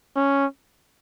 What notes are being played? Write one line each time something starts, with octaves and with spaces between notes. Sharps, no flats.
C#4